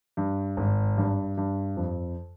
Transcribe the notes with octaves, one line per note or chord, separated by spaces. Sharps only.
G2
G#1
G2
G2
F2